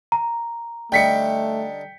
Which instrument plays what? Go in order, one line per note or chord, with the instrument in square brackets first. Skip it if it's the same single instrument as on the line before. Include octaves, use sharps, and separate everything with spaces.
[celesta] A#5
[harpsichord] D3 G3 D#4 [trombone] A3 [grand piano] G5 B6 C#7